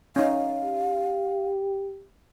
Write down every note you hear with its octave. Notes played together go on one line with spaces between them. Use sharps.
C#4 D#4 F5
G4